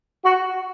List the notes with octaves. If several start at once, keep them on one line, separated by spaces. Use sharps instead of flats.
F#4